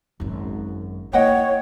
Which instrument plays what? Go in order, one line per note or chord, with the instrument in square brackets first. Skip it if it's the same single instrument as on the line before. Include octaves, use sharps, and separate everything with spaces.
[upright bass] G#1 F#2
[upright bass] A#3 E4 [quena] C#5 [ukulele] D#5 F#5 G5